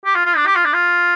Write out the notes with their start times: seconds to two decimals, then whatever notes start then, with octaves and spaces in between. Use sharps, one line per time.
0.05 G4
0.15 F4
0.25 F4
0.36 D4
0.46 G4
0.56 F4
0.65 D4
0.74 F4